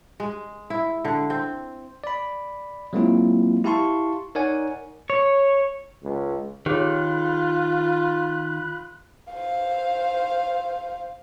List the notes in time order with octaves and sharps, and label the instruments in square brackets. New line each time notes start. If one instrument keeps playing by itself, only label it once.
[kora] G#3
E4
D3
C4
[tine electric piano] D5 B5
F#3 G#3 A#3 C4 E4 F4
E4 G4 F5 A5 C6 C#6
D#4 A#4 C#5 D5 F#5 G#5
[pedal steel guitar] C#5
[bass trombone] C#2
[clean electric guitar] D#3 [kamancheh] F4 [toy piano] G4 G#4 C#5 [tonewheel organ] B5 F#6
[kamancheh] C5 F5